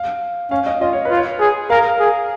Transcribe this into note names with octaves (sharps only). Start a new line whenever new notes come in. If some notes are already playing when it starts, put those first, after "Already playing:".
Already playing: F5
C#4 F5
D#5
F4 D#5
C#5
B4
F4
C#5
G#4
A#4 F5
G#4